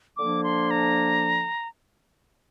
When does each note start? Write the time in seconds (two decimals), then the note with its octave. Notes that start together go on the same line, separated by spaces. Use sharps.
0.17 D3 F3 A#3 D4 D6
0.44 C6
0.71 A#5